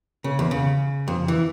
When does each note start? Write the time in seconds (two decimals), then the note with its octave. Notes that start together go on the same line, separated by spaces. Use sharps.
0.24 C#3
0.39 E2
0.51 C#3
1.08 F2
1.28 E3